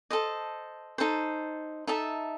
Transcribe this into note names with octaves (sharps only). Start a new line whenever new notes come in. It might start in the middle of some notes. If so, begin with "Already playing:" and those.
A4 C5 D#5
D#4 A4 C5
D#4 A4 E5 A5